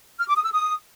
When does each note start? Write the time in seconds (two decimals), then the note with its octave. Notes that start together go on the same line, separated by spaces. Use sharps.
0.20 F6
0.28 D6
0.36 D#6
0.45 E6
0.53 D#6